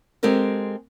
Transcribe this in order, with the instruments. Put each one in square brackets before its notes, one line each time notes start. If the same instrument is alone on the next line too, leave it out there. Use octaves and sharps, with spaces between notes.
[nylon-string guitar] G#3 C4 G4 A4 A#4